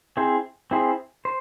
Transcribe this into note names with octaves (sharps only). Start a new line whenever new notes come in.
C4 E4 G#4 C5
C4 E4 G#4 C5
C5